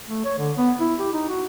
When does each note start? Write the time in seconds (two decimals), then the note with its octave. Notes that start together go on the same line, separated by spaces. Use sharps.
0.08 A3
0.25 C#5
0.38 D3
0.57 B3
0.80 E4
0.99 G4
1.13 D#4
1.29 F#4